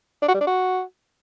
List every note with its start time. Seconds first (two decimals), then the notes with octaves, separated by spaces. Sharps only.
0.22 D4
0.28 F#4
0.34 G3
0.41 D4
0.47 F#4